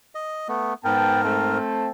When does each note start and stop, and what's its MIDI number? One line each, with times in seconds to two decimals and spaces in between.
0.15 0.48 75
0.48 0.74 57
0.48 0.74 59
0.85 1.58 44
0.85 1.24 59
0.85 1.58 70
0.85 1.24 79
0.85 1.24 81
1.24 1.90 57
1.24 1.90 60
1.24 1.90 81